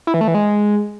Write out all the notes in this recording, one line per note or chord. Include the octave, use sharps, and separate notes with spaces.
E4
E3
A3
E3
G#3